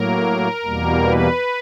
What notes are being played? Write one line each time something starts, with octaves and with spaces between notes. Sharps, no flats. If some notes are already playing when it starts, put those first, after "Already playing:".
Already playing: A2 F#3 A#3 A#4
E2 B2 G3 A#3
B4